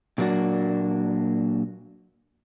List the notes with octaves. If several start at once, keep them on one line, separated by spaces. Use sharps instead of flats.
A#2 F#3 A#3 D4 F#4